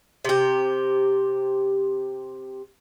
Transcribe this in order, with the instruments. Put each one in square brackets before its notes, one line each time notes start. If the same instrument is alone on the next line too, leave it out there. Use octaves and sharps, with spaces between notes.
[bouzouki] C3 G4